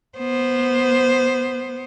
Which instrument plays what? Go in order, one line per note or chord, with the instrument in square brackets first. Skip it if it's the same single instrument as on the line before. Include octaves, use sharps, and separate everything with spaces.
[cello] B3 C5